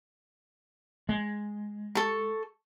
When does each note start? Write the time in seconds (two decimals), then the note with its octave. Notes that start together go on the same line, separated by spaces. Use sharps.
1.09 G#3
1.95 A4 C#6